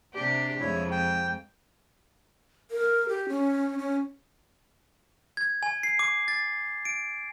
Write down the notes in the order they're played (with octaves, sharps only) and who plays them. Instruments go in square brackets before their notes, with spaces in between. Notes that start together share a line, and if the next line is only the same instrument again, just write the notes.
[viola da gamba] C3 D4 G4
[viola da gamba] F2 G#3 [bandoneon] E4 C#5
[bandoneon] G5
[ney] A#4
G4
C#4
C#4
[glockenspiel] G#6
G#5
C7
D6
A6
D7